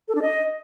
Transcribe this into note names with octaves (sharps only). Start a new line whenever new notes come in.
A4
D4
D#5